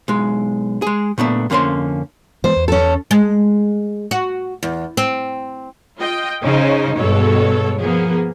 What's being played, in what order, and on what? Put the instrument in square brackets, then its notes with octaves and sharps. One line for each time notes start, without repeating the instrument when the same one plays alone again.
[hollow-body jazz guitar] B1 G#3
G#3 G#4
A#2 A3 B3 D4
F2 D3 A#3 C#4 C5 C6
[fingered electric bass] E3 G#3 B3 [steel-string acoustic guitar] C5
[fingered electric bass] E2
[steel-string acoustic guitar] C#4 A4
[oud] G#3
F#4
E2
C4
[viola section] F4 D#5 G5
[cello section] C#3 D#4 [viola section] C#4 C5
[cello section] G2 B2 [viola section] G#3 A4 C#5
[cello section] F3 B3 [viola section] A#3 G#4